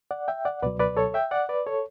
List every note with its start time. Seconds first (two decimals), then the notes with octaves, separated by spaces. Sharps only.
0.11 D5 F#5
0.28 E5 G5
0.45 D5 F#5
0.62 C#2 B2 F#3 B4 D5
0.79 B4 D5
0.97 A4 C#5
1.14 E5 G5
1.31 D5 F#5
1.49 B4 D5
1.67 A4 C#5